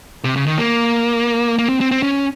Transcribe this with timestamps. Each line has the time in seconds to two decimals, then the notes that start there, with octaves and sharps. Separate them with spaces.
0.24 C3
0.36 C#3
0.47 D#3
0.58 A#3
1.59 A#3
1.69 C4
1.81 C4
1.91 C4
2.03 C#4